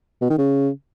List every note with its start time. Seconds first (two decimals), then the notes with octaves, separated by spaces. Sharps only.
0.22 B2
0.30 D#3
0.38 C#3